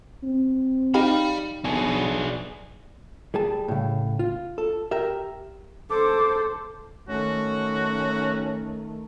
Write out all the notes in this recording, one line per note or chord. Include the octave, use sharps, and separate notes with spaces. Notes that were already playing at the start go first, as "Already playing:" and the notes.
C4
D#4 G4 D5 F5 B5
B1 B2 D4 G#4
G3 G#4 A5
A2 C#3
F4
A4
G4 A#4 E5
A4 C5 D6
D#3 A3 C#4 F#4